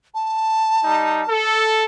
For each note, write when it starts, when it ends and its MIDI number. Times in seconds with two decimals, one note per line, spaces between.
0.14 1.48 81
0.83 1.21 55
0.83 1.21 63
1.28 1.84 69